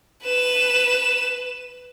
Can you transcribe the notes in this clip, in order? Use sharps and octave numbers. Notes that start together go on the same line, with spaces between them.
B4 E7